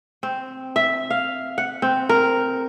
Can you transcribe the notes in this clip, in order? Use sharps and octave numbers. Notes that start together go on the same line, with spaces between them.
C4
E5
F5
F#5
C4
A#4